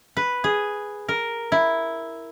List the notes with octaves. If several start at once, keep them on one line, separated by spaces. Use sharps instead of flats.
B4
G#4
A#4
E4